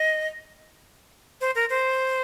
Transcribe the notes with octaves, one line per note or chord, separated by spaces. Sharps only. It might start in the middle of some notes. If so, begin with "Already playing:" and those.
Already playing: D#5
C5
A#4
C5